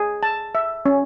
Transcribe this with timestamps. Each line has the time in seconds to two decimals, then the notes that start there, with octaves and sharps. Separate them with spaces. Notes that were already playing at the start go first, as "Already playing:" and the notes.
Already playing: G#4
0.23 A5
0.55 E5
0.86 C#4